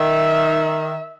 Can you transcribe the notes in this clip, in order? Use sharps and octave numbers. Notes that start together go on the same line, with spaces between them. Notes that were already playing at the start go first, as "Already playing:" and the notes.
Already playing: D#3 E5